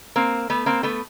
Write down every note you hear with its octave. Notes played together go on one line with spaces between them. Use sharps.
A#3 C4
A3 B3
A#3 C4
A3 B3